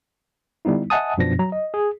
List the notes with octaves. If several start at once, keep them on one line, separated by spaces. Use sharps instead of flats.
D3 G3 B3 D#4 E4
D#5 E5 F#5 G#5 A5 D#6
F#2 B2 F3 B3 D4 A#6
F#3 A#5
D#5
G#4